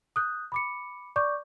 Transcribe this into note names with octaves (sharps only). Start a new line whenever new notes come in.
D#6 F#6 G6
B5 D6 C#7
D5 C#6 D6 G6